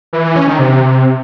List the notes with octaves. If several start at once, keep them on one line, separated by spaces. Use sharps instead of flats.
E3
E3
C#4
D#3
C3